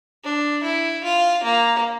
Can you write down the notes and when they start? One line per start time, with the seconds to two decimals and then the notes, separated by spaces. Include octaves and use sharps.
0.24 D4
0.64 E4
1.04 F4
1.43 A#3